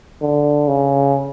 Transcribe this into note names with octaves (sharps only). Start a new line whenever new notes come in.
D3
C#3